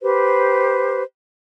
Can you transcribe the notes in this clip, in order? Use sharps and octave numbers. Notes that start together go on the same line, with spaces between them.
G4 B4 C5